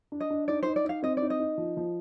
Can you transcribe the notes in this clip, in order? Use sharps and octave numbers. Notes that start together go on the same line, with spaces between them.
D4
D#5
D4
D#4 D5
D#4 C5
D5
D#4 F5
C4 D#5
D5
D#4
D#5
D#4
F3
F3